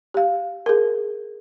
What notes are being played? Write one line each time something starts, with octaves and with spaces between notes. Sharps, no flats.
G4 F5
G#4 A#4